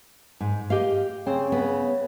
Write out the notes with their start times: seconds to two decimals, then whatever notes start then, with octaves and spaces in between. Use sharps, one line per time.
0.40 G#2
0.70 G4 D#5 F5
1.27 C#3 C4
1.52 B3